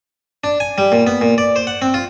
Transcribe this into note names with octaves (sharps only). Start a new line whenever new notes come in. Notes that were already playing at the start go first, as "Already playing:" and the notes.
D4
G#5
G3
A#2
B3
A#2
D5
C5
F#5
C4
F4